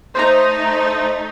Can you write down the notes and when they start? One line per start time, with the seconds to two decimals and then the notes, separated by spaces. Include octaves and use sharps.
0.15 A3 D#4 C5 A#5